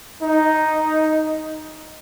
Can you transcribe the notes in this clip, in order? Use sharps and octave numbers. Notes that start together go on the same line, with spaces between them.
D#4